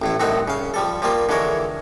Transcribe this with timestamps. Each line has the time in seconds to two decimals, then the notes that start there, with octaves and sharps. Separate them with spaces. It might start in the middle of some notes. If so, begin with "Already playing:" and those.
0.02 A1 A2 E4
0.20 C2 A2 C4 D#4 E5 F#5
0.48 C#3 F5
0.74 F3 G3 A4
1.02 F3 G3 A#3 F4
1.29 D3 E3 G#3 A#4 C#5